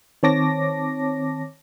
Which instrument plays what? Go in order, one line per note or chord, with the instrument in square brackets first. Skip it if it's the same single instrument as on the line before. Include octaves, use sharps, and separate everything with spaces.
[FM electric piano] D#3 C4 C#5 A5 D6 A#6